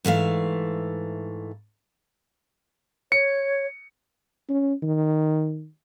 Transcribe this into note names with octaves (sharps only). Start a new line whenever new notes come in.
G#2 E3 A3 F5
C#5 C#7
C#4
D#3